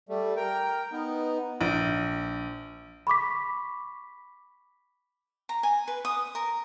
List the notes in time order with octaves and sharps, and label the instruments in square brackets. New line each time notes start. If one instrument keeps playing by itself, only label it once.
[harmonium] G3 A3
A#4 G5
B3 D#4
[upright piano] A#1
[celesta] B5 C#6 D6 B6
[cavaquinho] A#5
G#5
B4
D#6
A#4